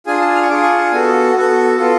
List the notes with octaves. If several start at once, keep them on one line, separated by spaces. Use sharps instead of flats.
D4 F4 G#4 G#5
A5
F6
C#6
D4 F4 G#4 D6
C#6
A5
B3 F#4 A4 G#5
B3 F#4 A4
B3 F4 A4